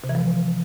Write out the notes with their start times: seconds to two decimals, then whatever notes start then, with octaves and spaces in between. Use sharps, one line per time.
0.04 C3
0.09 E3
0.15 F3